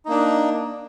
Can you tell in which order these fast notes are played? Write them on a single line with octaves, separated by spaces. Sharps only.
D#4 A#3 D4